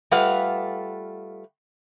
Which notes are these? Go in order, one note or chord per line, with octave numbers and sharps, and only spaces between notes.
G3 A3 F4 B4 F5 F#5